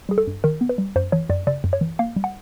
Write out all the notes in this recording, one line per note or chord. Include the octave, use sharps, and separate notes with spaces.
G3 G#4
A4
G2
D#3 A#4
B3
B4
G3
F#2 C5
E3 C#5
F#2 D5
C#3 D5
F#2
C#5
E3
A#3 F5
G3
F#5